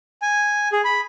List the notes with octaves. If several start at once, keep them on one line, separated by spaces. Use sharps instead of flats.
G#5
G#4
B5